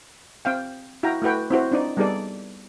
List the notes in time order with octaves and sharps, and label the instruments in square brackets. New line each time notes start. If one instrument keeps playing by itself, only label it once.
[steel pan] C4 F5 G5
E4 F#4 F5 G5 A#5
A3 E4 F#4 B4 G5
C4 E4 F#4 C5
C4 D4 D#4 D5
G3 B3 D#4 G#4 A4 D5